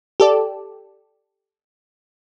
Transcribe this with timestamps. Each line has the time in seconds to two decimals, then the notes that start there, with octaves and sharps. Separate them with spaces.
0.20 G4 A4 D5